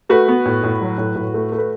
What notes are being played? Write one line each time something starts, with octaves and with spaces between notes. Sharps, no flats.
A3 F#4 B4
B3
A2
A2
F#3
A2
A2
A3
A3
B4